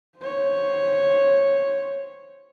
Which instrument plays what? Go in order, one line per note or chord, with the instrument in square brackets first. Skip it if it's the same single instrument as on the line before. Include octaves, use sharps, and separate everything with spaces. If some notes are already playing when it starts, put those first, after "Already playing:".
[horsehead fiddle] C5 C#5